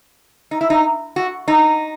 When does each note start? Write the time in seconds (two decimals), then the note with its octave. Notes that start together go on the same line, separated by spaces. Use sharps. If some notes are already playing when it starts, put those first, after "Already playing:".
0.51 D#4
0.61 E4
0.70 D#4
1.16 F#4
1.48 D#4